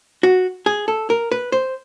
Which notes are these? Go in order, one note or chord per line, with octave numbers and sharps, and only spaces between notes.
F#4
G#4
A4
A#4
B4
C5